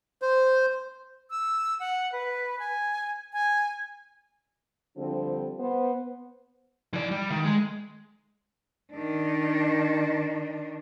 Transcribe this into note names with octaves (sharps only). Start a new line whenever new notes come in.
C5
E6
F#5
B4
G#5
G#5
D3 F3 G3 C4 D4
B3 C5
E3 D5
G3
D#3
G#3
D#3 D4